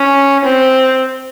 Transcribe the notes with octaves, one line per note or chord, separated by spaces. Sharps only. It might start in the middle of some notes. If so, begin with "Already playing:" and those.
Already playing: C#4
C4